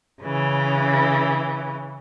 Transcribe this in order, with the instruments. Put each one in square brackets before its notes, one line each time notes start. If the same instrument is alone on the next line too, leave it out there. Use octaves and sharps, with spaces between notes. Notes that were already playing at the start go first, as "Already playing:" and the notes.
[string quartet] C#3 E3